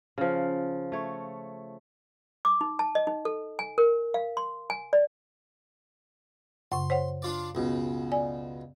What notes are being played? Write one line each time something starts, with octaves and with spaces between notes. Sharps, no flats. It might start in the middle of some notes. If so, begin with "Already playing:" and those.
C#3 F3
A3 C#5
D6
D#4
A5
D#5
D#4
A4
G#5
A#4
F5
C6
G#5
D5
F#2 C#3 C6
C5 C#5 F#5
D4 F4 D5
C#2 B2
D5 G#5